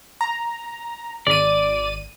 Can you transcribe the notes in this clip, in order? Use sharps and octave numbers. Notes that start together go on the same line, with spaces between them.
A#5
G#1 D5 D#7